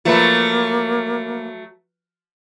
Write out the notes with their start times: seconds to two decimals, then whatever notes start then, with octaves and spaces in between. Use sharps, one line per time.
0.05 F3 F#3 A3 A#3 B4 B5